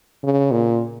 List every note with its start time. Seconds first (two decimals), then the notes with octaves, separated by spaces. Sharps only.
0.23 C#3
0.52 A#2